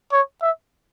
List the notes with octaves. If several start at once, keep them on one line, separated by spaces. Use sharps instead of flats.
C#5
E5